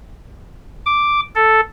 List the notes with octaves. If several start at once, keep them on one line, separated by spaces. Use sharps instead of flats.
D6
A4